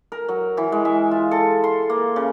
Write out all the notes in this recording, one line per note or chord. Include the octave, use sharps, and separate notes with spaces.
A#4
F#3
E3
G#3
E5
F4
A4
C6
A#3
C#3